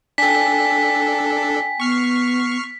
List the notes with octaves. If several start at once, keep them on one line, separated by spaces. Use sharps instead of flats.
D4 A4 G5 G#5 B6
B3 C#6 F6 C7